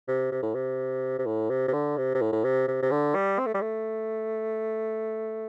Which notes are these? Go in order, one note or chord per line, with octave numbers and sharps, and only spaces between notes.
C3
C3
A2
C3
C3
A2
C3
C3
D3
C3
C3
A2
A2
C3
C3
C3
D3
G3
C4
A3
G3
A3